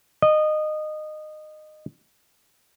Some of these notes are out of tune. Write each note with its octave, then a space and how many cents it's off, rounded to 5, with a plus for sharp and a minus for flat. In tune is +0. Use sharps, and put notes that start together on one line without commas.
D#5 -20